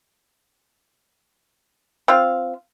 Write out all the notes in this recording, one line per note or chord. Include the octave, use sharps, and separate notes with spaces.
C4 F4 F5